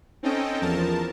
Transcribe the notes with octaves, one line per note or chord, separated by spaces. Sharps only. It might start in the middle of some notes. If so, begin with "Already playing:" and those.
C4 C#4 D#4 A4 D#5 G5
E2 F3 A#4 A5